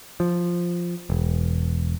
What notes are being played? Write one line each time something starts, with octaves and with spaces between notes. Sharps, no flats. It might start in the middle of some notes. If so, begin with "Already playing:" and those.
F3
E1